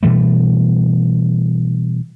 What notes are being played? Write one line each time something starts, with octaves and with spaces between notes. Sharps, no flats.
B2 E3 G3 A3